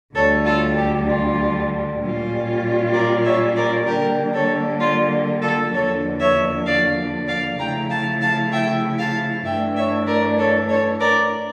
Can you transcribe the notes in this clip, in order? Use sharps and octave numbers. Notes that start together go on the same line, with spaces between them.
D2 D3 G3 A4 C#5
F4 A4
G4
F4
A#2 G3 C#4 F4
A#4 D5
C#5 E5
A#4 D5
D3 G3 A#3 D4 G4 A#4
A4 C#5
F4
F4 A4
E2 D3 F3 A#3 D4 A4 C#5
C#5 E5
D5 F5
D5 F5
C#3 F3 A3 E4 G5 A#5
F5 A5
F5 A5
E5 G5
F5 A5
G2 E3 A3 D4 E5 G5
C#5 E5
A#4 D5
A4 C#5
A4 C#5
A#4 D5